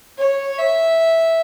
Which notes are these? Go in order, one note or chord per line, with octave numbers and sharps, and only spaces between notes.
C#5
E5